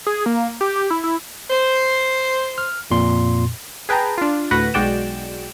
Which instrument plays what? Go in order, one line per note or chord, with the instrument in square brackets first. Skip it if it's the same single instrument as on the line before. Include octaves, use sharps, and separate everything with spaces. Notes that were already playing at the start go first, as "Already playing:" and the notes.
[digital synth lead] G#4
A#3
G4
G4
E4
E4
[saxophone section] C5
[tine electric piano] F6
F2 A#2 C6
[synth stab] G#4 B4 G5 A5 A#5
D4 F4
D2 A2 F#4 B4 F#5 A#6
B1 G#3 F#4 D5 G5 E7